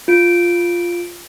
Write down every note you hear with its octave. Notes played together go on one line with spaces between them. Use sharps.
F4 D7